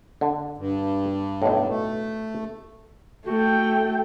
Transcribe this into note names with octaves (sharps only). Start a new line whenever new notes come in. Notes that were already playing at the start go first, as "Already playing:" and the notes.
D3
G2
B1 A2
A3
A3 F#4 G5